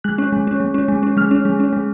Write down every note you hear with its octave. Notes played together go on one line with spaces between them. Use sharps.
G#3 F#6
C#4
G#3
C#4
G#3
C#4
G#3
C#4
G#3 F6
C#4
G#3
C#4
G#3